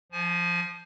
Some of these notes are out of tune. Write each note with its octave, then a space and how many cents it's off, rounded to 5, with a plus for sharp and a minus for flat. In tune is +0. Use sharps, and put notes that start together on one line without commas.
F3 +0 G#5 +35